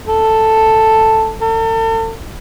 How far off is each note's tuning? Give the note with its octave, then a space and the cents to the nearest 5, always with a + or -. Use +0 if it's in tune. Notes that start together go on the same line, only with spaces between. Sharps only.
A4 +5
A4 +40